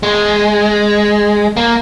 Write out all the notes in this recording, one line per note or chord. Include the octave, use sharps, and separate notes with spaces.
G#3
A#3